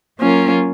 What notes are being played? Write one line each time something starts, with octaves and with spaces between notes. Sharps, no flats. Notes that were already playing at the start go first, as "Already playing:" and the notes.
F#3 A#3 C#4 F4 A#4